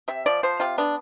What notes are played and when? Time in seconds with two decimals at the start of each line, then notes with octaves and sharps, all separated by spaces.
0.08 C3 E5
0.26 F3 D5
0.43 F3 C5
0.60 C3 F4
0.78 B3 D4